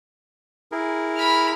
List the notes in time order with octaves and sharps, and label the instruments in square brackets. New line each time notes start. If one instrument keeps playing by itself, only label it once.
[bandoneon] E4 G#4 A#4
[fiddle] B5 F6